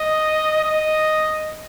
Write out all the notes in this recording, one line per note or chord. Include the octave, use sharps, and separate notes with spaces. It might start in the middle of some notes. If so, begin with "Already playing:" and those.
Already playing: D#5
D#5